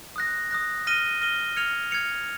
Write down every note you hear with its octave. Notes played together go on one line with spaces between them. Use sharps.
D#6 F#6 A#6
D#6 F#6 A#6
F6 A#6 D#7 G7
F6 A#6 D#7 G7
F6 G#6 C#7 F7
F6 G#6 C#7 F7